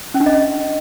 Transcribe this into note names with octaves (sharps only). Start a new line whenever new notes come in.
C#4
D4
D#5